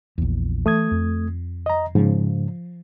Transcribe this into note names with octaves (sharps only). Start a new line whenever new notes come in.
A#1 E2
E3 A3 D#6 G#6
F2
D#5 A#5
G#2 C#3 F3